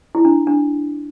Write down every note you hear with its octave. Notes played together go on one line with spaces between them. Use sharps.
E4
D4
D4